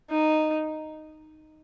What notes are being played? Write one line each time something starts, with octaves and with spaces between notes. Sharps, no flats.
D#4